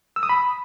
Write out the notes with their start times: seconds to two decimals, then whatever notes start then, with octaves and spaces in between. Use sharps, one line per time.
0.16 E6
0.23 D#6
0.29 B5